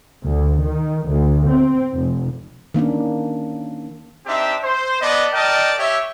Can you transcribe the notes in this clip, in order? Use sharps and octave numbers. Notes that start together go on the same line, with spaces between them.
D2
D#3
D2
C4
F1
D#3 A#3 C#4 D4
C4 D4 D#4 G4 E5
C5
B3 B4 D5 D#5 A5
A#4 D5 D#5 G5 A5
G4 C#5 E5